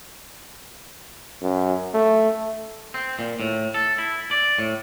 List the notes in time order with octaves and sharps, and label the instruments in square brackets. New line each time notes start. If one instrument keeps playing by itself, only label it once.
[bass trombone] F#2
A3
[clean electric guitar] C4
A#2
A2
A4
E4
D5
A2